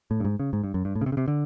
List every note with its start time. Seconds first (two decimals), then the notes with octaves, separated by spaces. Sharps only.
0.11 A2
0.20 G2
0.25 G#2
0.39 C#3
0.53 G#2
0.64 G2
0.74 F#2
0.85 G2
0.95 A2
1.01 C#3
1.06 C3
1.12 C#3
1.17 C3
1.28 D3